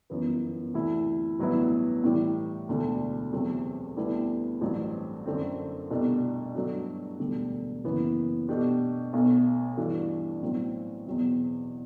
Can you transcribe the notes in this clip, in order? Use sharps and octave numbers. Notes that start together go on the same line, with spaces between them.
G1 F#2 E3 B3
D2 C3 E3 A3 E4
A1 G2 F#3 B3 E4
A2 E3 G3
E1 D2 D3 A3
E2 C3 F#3 A3 C4
D2 D3 G3 B3 E4
A1 G2 F#3 C4
F#2 D3 A3 C4
C2 B2 A3 D4
G2 F#3 A3 D4 F#4
E1 D2 D3 G3
F#1 F#2 E3 B3
B2 A3 D4 G4
B1 B2 A3
G2 E3 A3 D4 F#4
B1 A2 F#3 C4
E2 B2 F#3 C4